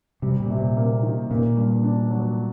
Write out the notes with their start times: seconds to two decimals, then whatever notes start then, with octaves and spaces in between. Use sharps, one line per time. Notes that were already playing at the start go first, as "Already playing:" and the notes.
0.22 C3 G3
0.40 A#2
0.50 C3
0.58 A#2
0.77 A#3
1.03 D#3
1.31 A#2 A#3
1.57 G2
1.83 D4
2.11 F#3